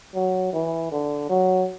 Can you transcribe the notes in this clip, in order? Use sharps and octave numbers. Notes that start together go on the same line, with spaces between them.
F#3
E3
D3
F#3